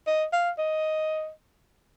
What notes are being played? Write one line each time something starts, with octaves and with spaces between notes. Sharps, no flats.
D#5
F5
D#5